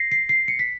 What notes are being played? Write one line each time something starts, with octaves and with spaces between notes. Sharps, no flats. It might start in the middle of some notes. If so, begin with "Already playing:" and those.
Already playing: A#6 C7
C7
C7
C#7
B6